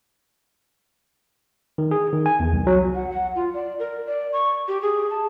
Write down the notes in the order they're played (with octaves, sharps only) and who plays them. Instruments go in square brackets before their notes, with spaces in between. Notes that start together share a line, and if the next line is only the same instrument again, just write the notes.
[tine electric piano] D#3
G#4
D#3
G#5
E2
C2
F#3
[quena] F#5
F#5
F4
D5
A#4
D5
C#6
G4
G#4
A5